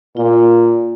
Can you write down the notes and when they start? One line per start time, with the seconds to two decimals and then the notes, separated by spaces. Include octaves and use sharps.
0.17 A#2 F4